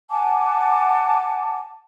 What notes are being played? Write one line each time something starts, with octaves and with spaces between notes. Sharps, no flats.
F#5 G#5 A5 D6